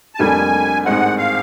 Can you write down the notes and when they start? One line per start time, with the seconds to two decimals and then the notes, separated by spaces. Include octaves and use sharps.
0.15 A5
0.19 F1 F2 D3 G3 A#3 G#5
0.85 A1 G#2 D#3 G#3 C4 F#5
1.18 F5